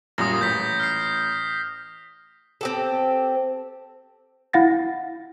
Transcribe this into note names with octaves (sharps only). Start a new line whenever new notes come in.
F#2 A#2 G3 D#6 A#6
A1 G6 B6
F6 C7
C4 G4 A4
E4 F5 F#5 A6 A#6